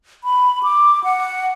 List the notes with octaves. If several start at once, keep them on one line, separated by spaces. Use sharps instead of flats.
B5
D6
F#5